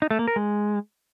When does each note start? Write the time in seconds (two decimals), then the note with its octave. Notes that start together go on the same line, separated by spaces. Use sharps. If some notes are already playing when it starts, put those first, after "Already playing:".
0.02 D#4
0.11 A3
0.19 A#3
0.28 A#4
0.36 G#3